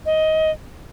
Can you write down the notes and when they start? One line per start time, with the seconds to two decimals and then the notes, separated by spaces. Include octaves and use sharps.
0.06 D#5